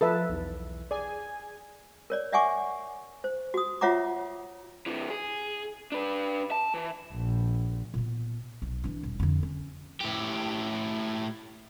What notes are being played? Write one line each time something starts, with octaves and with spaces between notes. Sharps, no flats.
F3 A4 B4 E5 A5
B1 E2
G#4 D5 G#5
A#4 C#5 D5
D5 E5 F#5 G#5 C#6 D6
C5
F#4 D#6
F4 C#5 E5 F#5 A#5 D6
C3 E3
G#4
D4 B4
A5
E3
A#1
A#2 B3
B1
E3 D4
D#1
F2 D3
C#4
A2 G4